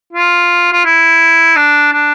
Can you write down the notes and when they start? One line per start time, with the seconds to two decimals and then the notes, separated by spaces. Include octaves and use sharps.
0.13 F4
0.73 F4
0.85 E4
1.56 D4
1.93 D4